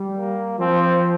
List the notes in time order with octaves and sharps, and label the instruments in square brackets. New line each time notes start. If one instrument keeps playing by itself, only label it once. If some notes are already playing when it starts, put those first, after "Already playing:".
Already playing: [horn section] G3
[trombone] A#3
[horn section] F3 [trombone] C4